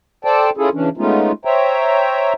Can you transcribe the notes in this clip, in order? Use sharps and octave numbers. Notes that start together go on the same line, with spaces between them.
A4 C5 D5 G5 A5
C#4 E4 F4 G#4 A4
C#3 E3 C#4 D4
G#3 A3 B3 C#4 D#4 F4
C5 C#5 E5 G5 A#5